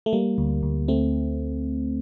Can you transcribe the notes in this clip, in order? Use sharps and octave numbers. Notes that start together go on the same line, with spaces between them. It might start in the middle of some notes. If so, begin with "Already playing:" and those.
A3
G3 A#3
D2
D2
A3 C4